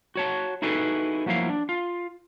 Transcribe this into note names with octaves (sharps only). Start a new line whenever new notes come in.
F#4 C#5 A5
D#4 E4 F#4 G#4 A4 B4
F3 F#3 A#3 E4 F5
D4
F4